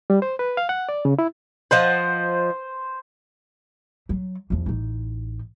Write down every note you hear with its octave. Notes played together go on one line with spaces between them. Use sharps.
G3
C5
B4
F5
F#5
D5
C#3
E4
F3 C5 D#5 F#5
F#3
E2 F3
A1 D#4